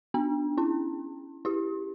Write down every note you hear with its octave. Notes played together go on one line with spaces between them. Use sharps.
B3 D4
C#4 E4
E4 G4